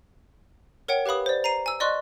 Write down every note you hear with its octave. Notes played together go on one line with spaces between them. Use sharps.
A#4 C#5 F#5 G5
G4 B4 F5 B5 D#6
C5 D5
A#5 C7 D#7
G#5 E6
D5 D#5 C6 C#6 F#6